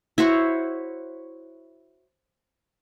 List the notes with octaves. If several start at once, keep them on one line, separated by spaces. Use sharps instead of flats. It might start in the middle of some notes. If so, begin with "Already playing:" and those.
E4 F#4 C5 C#5